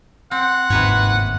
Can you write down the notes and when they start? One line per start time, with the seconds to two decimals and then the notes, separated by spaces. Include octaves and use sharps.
0.31 C4 F#5
0.70 G1 D#2 G#2 C3 B4 C#5